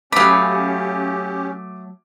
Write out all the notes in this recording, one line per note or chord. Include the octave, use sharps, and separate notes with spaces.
F#3 A3 C#4 G4 F5 B5 D6 D#6